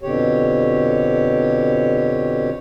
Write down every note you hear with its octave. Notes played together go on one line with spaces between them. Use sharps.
F2 B2 D3 G4 C#5